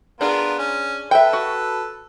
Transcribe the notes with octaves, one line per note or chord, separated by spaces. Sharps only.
B3 D4 F4 G#4 A#4
C#4
A4 B4 E5 G5
F#4